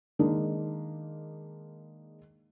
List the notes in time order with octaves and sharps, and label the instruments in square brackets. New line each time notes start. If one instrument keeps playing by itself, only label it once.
[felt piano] D#3 G#3 A#3 D4 D#4